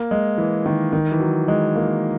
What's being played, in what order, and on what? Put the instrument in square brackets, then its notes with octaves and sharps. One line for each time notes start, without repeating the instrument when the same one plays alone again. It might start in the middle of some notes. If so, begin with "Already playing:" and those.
Already playing: [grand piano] A#3
G#3
E3
D#3
D#3
E3
F#3
G#3
A#3